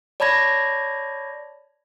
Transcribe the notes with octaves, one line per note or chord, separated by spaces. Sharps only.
C#5 D5 A5 B5 G#6 A#6